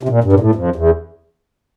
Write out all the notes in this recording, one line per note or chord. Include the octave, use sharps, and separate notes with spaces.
C3
A#2
G2
A#2
A2
F2
E2